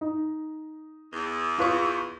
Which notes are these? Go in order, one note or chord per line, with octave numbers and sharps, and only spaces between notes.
D#4
E2
F4 B4 C#6